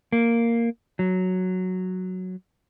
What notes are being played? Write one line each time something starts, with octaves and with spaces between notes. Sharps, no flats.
A#3
F#3